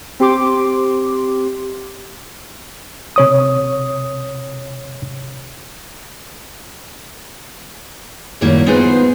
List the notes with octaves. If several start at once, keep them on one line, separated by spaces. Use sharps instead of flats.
C4 G4 C6 D6
C3 C#5 D#6
F#2 A2 D#3 G3 A#3 E4
B3 D#4 F4 G#4 B4 C5